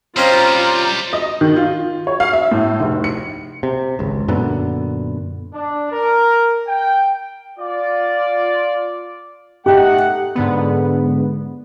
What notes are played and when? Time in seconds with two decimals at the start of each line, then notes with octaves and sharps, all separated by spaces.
0.17 G3 C4 C#4 F4 C5 D#5 A#5
1.13 D#5
1.41 D#3
1.56 F4
2.07 C#5
2.20 F5
2.33 E5
2.51 A2
2.80 F1
3.04 C#7
3.63 C3
3.99 G#1 C#2
4.28 F#2 A#2 D3 B3
5.54 D4
5.91 A#4
6.67 G5
7.59 F4 D5
9.66 A3 D#4 G4 F#5
10.35 G#2 D3 B3